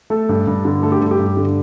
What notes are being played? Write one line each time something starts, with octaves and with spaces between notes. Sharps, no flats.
A3 A4
G2
G2
D3
A3 A4
G4
G2
G4
G2
D3